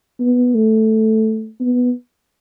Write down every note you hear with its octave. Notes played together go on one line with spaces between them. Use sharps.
B3
A3
B3